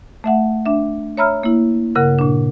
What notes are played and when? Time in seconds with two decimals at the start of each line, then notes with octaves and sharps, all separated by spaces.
0.24 A3 E5 F#5
0.66 D4 E5
1.17 C#5 E5 A#5 B5 E6 F6
1.43 A#3 E4
1.95 G2 C#3 A#4 F#5 F#6
2.19 A#2 D4